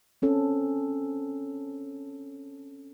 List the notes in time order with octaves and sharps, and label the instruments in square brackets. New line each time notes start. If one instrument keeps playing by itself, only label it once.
[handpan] C4 C#4 A4